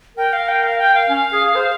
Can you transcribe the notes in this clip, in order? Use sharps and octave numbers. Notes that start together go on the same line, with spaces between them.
A#4 G5
F5
G5
F5
G5
F5
C#4
G#4
G#4
C5